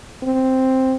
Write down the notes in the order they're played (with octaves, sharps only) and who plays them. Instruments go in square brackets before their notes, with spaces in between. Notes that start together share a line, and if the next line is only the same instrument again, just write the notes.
[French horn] C4